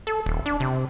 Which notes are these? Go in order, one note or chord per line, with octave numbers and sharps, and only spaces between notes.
A4
D#1
D4
C3